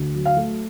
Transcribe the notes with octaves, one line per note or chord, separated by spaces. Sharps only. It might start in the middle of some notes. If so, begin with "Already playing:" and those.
Already playing: D2
F#3
F5
A3